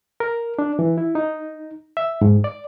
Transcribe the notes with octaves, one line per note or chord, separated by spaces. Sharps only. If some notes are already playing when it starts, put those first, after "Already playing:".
A#4
D4
E3
E4
D#4
E5
G#2
D5